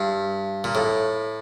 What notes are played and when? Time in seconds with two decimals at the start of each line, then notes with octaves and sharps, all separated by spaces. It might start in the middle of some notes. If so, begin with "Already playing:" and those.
Already playing: G2
0.64 A#2
0.75 A2